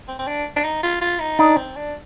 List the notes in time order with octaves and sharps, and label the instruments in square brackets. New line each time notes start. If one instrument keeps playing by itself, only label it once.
[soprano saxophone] C4
C4
D4
D4
D#4
F4
F4
D#4
[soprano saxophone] D4 [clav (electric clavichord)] D#4
[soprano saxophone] C4
D4